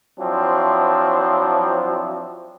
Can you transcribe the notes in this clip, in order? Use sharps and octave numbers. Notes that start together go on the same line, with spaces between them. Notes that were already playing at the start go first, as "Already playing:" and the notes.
F3 F#3 C4 D4 E4